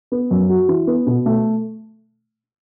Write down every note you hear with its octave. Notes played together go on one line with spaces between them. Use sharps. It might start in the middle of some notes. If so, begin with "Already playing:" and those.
B3
F#2
F#4
E3
B3
B2
A3